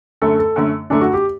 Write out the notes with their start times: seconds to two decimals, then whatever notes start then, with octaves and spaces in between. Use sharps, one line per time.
0.22 F#2 D3 A3 A4
0.39 A4
0.56 F#2 D3 A3
0.90 F#2 D3 A3 D4
1.01 F#4
1.14 G4